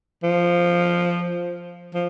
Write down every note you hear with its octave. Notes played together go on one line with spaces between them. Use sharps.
F3
F3